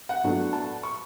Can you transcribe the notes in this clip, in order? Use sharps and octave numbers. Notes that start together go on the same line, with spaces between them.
F#5
A2 F#3 B3 D4
A5
C#6